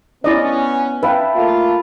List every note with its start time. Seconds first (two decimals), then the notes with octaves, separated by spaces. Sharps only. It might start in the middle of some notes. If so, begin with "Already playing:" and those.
0.24 B3 C#4 E4 D5 D#5
1.03 E4 B4 F5 G5 A5
1.35 A3 A#3 F4